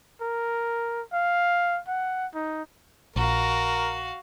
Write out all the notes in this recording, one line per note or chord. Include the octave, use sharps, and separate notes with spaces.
A#4
F5
F#5
D#4
A#1 F#4 A#4 F5